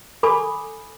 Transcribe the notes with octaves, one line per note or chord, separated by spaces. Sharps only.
A4 G#5 B5 D6 D#6